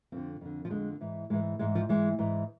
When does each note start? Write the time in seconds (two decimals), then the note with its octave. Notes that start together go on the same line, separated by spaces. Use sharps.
0.12 F2 D3 C4
0.41 F2 D3
0.65 F3
0.70 F2 D3 G#3
1.01 G#2 E3
1.30 G#2 E3 G#3
1.59 G#2 E3 G#3
1.75 F3
1.89 G#2 E3 G#3
2.19 G#2 E3